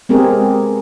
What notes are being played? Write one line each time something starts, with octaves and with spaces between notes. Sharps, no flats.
G#3 B3 C4 G4 G#4 A#4